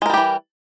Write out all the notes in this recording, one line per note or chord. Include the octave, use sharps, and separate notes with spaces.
E3 G3 G#3 G4 A#4